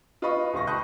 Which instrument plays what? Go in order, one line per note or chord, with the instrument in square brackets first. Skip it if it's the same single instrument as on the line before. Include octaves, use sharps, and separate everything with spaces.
[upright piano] F4 B4 D#5 B5 C#6
D#1 C#2 F4 C6 C#6 A#6
A5 B5 C#6 D#6 F#6 G6